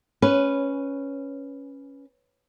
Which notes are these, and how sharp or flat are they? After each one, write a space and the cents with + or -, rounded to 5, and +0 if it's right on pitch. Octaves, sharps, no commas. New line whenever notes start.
C#4 +0 B4 +0